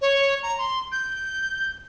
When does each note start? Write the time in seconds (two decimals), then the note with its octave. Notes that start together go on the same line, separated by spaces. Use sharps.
0.02 C#5
0.43 A#5
0.58 C6
0.92 G6